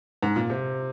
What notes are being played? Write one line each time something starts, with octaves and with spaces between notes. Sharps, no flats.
G#2
A#2
C3